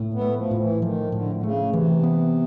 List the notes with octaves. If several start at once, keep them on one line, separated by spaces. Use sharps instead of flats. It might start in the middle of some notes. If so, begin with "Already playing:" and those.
Already playing: A2
B3
A3
F3
A2
E3
D#3 F3
A2 D3
D3
C#3 A3
C3 E3
B3